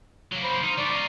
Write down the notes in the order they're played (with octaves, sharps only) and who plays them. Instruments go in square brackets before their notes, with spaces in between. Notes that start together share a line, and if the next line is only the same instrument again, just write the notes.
[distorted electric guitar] F#3 A#3
[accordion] C5 B5 D6
[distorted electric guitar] D#4 [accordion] C6 F6
[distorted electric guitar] G3 D4 [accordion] D5 C#6
[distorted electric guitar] D#4 F4